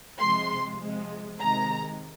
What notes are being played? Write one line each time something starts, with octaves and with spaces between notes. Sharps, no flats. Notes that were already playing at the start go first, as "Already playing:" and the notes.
C3 F3 G#3 C6
C3 F3 G#3
C3 D#3 G#3 A#5